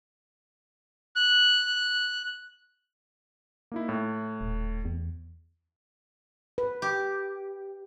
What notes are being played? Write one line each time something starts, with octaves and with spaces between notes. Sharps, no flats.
F#6
A#3 D#4 E4
A2
D#1
E2
B4
G4